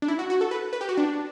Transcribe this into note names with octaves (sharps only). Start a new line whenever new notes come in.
D4
E4
F#4
F#4
A4
B4
B4
G4
F#4
D4